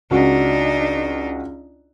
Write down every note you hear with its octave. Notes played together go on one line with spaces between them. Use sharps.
C#2 D4 D#4 F#4